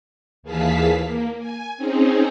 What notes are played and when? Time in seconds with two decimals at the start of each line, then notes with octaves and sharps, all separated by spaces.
0.43 D#2 E3 G#4 F5 A5 B6
1.03 A#3
1.39 G#5
1.77 C4 C#4 D#4 G#4